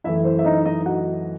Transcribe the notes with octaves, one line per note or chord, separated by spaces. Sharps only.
F#2 E3 A3 E4 E5
C5
E5
D#4 D#5
D#4 D#5
F#4 F#5